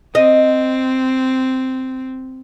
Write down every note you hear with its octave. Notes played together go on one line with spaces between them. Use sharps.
C4 D#5